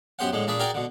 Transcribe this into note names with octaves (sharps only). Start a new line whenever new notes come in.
F#2 B3 G4 C5 F#5
A2 D3 G#3
A#2 D4 G#4 B5
F#4 G#4 A#4 D5 G5
B2 D3